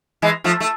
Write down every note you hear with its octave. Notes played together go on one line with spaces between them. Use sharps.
E3 G#3
F3 A3
A3